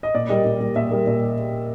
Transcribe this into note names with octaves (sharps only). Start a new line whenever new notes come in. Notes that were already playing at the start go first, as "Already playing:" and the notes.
D#5
A#2 D5
G3 A#3 D#5
A#2
G3 A#3
A#2 E5
G3 A#3
A#2